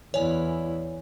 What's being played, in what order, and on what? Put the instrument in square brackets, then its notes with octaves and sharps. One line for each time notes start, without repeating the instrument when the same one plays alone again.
[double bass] E2 E4 [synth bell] C#5 D5 G#5